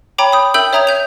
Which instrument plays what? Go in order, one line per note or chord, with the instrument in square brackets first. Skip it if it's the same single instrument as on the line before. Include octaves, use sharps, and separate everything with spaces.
[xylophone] C#5 G5 A#5 B5 D6
B5 D#6 G6
A#4 E5 G5 E6 G6 F#7
C#5 E5 A#5 D#6 G#6 F7
E5 G6 F7